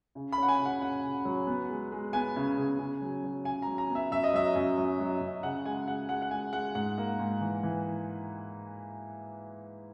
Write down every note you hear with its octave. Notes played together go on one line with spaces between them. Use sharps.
C#3
B5
C#4 F#5
G#5
C#3
F#5
C#4 F#5
C#3
F#3
B3
G#3
G#3
B3 G#5
C#3
C#3
C#3
F#3
F#3
C#3 G#5
F#3 A#5
A#5
B3
E5
F#2 E5
D#5
F#3 E5
F#2
F#3
F#3
F#2
C#3 F#5
G#3 G#5
G#3 F#5
G#3 F#5
F#5
G#3 G#5
G#3 F#5
G#2 F#5
A#3
G#2
E3
E3